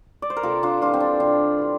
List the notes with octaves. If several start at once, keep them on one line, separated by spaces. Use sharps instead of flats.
D5
C5
A#4
C3 F4 A4
D4 F4
E3 G3 D4 F4
C4
D4
C3 D4
E3 G3